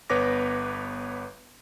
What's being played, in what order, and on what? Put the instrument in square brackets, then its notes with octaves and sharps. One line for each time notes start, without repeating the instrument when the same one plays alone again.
[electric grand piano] G1 B3 B4 C#5 D6 A#6